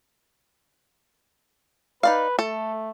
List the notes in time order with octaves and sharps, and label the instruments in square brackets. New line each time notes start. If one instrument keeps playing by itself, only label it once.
[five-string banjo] D#4 D5 F5 [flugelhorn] B4
[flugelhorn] A3 [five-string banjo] A4